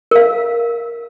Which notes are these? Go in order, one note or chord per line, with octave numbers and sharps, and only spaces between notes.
A#4 F5